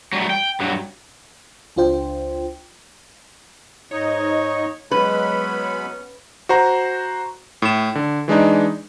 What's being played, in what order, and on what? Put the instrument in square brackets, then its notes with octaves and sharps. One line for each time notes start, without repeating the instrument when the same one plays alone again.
[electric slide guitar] F#3 G3 A3
G5
G2 F#3
[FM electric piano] C#2 D4 F4 C5 G5
[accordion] G#2 D#4 D#5 [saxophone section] C#5
[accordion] F#3 G#3 B5 [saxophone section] B3 C#4 [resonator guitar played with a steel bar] B4
[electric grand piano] F#4 C5 A#5
A2 E7
D3
E3 G#3 D4 D#4